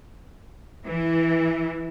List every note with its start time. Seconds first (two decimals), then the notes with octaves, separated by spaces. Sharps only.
0.85 E3